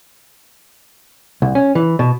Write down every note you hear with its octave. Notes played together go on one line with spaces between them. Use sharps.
C2
C#4
E3
B2